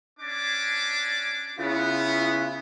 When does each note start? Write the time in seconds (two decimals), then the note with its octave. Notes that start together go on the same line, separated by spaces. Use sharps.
0.19 C#4 D4 D6
1.59 C#3 B3 E4 F4